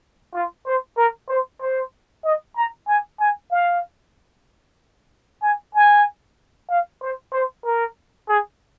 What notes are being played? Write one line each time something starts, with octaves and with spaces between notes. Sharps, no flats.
F4
C5
A#4
C5
C5
D#5
A#5
G#5
G#5
F5
G#5
G#5
F5
C5
C5
A#4
G#4